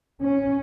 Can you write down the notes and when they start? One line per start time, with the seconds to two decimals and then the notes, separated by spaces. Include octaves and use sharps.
0.21 C#4